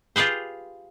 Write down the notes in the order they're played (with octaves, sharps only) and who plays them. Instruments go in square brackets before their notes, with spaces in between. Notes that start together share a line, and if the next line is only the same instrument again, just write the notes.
[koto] F4 G4 G#4 B4 C5